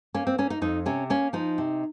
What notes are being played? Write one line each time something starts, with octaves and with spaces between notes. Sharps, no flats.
A#3 C#4
C4
A#3 C#4
D#4
F2 D#4
C3 C#4
A#3 C#4
F3 D#4
C3